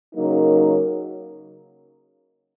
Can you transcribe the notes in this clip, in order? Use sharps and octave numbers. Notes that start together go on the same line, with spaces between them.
C#3 F#3 A#3 D#4 A#4